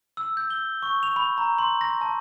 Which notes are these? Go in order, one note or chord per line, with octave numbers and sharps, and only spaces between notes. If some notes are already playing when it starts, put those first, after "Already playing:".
E6
G6
G7
C#6
F7
B5
A#5
C6
A#6
A5